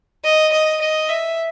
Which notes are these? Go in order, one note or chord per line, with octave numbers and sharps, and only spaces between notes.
D#5
D#5
D#5
E5